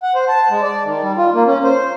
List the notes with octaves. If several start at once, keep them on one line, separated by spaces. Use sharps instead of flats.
F#5
C5
A5
G#3
D5
D#3
G3
F4
A#3
C#4
C5